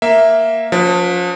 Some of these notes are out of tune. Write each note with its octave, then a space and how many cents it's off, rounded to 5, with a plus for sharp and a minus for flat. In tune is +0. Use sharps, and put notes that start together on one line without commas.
A#3 +0 E5 +0
F3 +35 C#4 +40 B4 +0